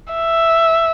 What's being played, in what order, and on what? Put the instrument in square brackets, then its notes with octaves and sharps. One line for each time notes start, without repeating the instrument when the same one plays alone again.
[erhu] E5